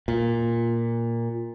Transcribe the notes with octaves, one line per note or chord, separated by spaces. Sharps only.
A#2